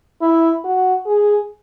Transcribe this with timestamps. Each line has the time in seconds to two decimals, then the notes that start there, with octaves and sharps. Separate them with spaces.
0.21 E4
0.65 F#4
1.07 G#4